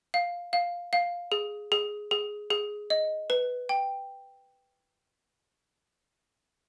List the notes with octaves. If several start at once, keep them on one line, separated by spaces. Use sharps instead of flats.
F5
F5
F5
G#4
G#4
G#4
G#4
D#5
B4
G5